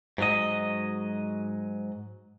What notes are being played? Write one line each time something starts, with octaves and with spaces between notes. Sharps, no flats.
G#2 F#3 D#5